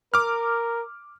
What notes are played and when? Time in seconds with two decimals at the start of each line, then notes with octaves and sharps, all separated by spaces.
0.14 A#4 D6 F6